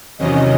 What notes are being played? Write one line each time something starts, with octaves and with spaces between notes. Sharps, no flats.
E2 C3 D#3 F#3 C#4 D#5